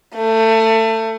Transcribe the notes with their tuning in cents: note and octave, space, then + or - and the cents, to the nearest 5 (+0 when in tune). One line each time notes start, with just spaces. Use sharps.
A3 +25